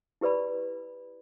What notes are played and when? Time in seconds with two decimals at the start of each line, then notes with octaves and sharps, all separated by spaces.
0.21 E4 G4 B4 D5 B5